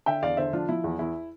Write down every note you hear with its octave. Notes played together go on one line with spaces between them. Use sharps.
D3 E5 G5
E2 D5 F5
D3 C5 E5
F3 D4 F4
F3 E4
E2
E2 E4